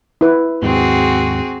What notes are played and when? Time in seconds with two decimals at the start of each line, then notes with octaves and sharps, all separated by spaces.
0.21 E4 B4
0.63 D#2 G#2 C4 F#4 G#4